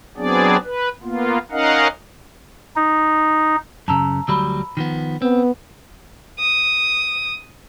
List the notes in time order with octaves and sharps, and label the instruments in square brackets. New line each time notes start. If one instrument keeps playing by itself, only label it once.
[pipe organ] F#3 B3 C4 D4 G#4 D5
B4
A#3 B3 F4
C#4 D#4 A#4 D#5 F5 F#5
D#4
[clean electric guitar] F#2 C#3 [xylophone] A5 A#5 E6
[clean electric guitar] D2 F#3 G3 [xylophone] B5 E6
[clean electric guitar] D#3 F3 B3
[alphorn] B3 [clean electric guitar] C4
[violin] D#6